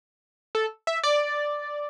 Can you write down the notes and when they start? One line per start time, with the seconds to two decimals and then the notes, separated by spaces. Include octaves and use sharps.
0.55 A4
0.87 E5
1.03 D5